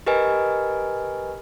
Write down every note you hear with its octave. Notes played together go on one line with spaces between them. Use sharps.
G4 A#4 B4 D#5 G#5